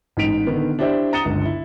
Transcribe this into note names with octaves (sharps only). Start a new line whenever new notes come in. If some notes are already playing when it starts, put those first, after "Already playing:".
A1 G#2 D#4 B6 D7 F7
D3 D#3 B3
D4 E4 G4 C5 D5 E5
A#5 D#6 A6 C#7 E7 G7
G1 C#2 D3
E4